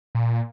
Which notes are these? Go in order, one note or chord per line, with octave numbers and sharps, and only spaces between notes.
A#2